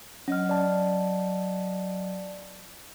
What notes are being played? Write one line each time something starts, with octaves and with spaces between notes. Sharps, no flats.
F#3 C#4 D#5 F6
D5 A5